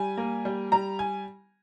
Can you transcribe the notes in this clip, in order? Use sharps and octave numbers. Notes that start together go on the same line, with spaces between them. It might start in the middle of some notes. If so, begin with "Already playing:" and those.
Already playing: G3 G#5
A#3
G3
G3 A#5
G#5